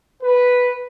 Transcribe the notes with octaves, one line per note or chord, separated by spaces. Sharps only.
B4